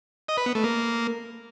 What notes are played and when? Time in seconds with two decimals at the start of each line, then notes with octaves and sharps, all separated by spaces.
0.29 D#5
0.37 B4
0.46 B3
0.55 A3
0.64 A#3